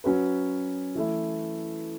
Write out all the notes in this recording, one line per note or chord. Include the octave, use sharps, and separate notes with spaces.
F#3 C#4 F#4 B4
E3 A3 E4